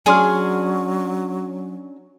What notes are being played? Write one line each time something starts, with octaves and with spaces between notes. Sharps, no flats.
F#3 C#4 D4 G#4 G#5 C6 F6